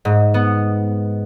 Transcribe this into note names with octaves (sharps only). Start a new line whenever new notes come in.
G#2
B3